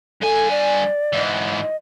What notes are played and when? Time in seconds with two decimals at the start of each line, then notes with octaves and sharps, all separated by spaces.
0.22 G2 A4 G#5
0.51 D5
1.13 G#2 E3
1.61 D#5